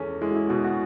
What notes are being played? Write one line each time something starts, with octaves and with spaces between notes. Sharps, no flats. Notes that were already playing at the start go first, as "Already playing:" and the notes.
Already playing: E2 C#4 G#4 A4
G#3 E4
F#4
E4
B2 F#4
F#4